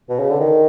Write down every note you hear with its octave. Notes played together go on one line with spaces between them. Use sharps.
B2
C#3
D3
D#3